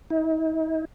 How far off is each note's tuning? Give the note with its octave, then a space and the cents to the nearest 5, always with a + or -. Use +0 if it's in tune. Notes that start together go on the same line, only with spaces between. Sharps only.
D#4 +45